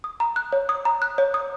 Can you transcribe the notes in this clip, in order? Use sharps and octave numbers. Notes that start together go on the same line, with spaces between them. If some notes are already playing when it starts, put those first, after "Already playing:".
D#6
A#5
F#6
C#5
D#6
A#5
F#6
C#5
D#6